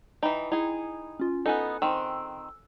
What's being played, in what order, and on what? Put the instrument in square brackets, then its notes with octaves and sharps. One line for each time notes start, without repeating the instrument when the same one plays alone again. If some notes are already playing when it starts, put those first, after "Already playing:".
[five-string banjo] E3 D#4 [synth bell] G5 A#5 B5
[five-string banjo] D#4 G#4 [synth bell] E4
[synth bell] C#4 F4
[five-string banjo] B3 D#4 [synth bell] A4 G#5 F#6
[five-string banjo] D#3 C4 [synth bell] E6